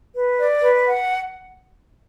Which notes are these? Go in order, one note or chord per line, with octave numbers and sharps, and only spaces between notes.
B4
D5
B4
F#5